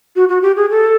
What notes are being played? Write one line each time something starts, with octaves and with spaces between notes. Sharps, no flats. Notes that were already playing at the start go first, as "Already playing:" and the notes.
F#4
F#4
G4
G#4
A4